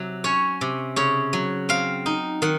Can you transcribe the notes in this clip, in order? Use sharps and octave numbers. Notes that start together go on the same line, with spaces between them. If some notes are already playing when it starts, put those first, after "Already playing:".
Already playing: C3 F#3
C#4 C#5
C3
C#3 C#5
F#3
C4 F5
D#4
D#3 F#5